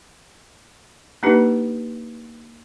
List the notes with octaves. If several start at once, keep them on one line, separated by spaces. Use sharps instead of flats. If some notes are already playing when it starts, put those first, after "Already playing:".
A#3 D4 D#4 G4 B4